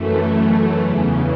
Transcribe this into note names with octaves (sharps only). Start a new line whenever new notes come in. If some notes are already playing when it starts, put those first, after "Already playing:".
Already playing: F#2 E3 A3
E2 C#3 E3